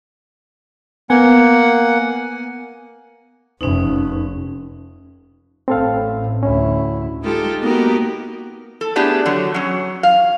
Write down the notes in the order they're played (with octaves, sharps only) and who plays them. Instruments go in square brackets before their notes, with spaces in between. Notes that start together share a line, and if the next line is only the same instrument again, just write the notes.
[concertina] A#3 F#5 [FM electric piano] B3 G#5
[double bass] F1 [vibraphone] C#4 D#4
[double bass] A1 A2 [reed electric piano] C4 A4 F5
[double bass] D2 E4 [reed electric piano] C#4
[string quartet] G#3 D#4 F4 G4 A4
A#3 B3 D#4 F#4 G4 A#4
[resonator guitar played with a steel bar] A4
A3 B3 D4 G4 G#4
D3 F#3
F#3 C#4
F5